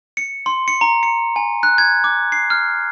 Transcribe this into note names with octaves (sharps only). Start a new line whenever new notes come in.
C#7
C6
C#7
A#5
C#7
G#5
F#6
G#6
D6
C7
F6